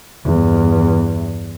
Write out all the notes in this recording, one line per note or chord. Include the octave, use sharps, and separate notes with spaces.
E2 G2